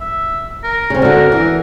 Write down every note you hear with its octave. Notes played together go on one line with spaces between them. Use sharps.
E5
A#4
C#3 C4
D3 F#4 A#4
E3